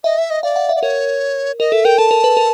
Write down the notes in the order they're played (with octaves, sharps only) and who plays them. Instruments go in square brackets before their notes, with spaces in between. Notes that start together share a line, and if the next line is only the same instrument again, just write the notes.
[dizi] D#5 [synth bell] E5
[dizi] E5
D#5
[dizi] D5 [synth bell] F5
[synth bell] F#5
E5
[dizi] D5
[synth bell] A#4 [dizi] C#5
[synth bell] A#4 [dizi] D#5
[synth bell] A4 [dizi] E5
[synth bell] A#4 [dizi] G5
[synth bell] A4 [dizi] A5
[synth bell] A#4
B4
A#4